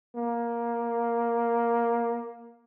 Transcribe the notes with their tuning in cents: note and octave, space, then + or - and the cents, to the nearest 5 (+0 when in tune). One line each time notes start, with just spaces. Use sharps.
A#3 +10